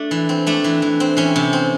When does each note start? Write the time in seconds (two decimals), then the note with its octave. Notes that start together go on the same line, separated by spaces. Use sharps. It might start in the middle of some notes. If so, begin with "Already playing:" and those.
Already playing: A3 D4
0.11 E3
0.29 C4
0.47 A3 D4
0.64 E3
0.82 E3
1.00 C4
1.17 E3 C#4
1.36 C3
1.53 C4